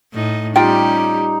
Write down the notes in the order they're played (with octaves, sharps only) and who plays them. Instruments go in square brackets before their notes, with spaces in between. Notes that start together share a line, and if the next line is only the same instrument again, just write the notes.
[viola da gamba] A2 D#4
[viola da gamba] G3 C#4 G4 [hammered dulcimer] D#4 [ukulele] F4 G5